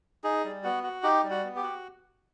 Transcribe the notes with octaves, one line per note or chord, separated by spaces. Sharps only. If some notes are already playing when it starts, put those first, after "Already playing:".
D#4 G#4
G3
B3 F#4
F#4
D#4 G4
G3
F#4
B3
G4
F#4